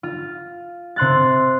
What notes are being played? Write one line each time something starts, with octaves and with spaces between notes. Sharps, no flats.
F4
C3 C6 F#6 A6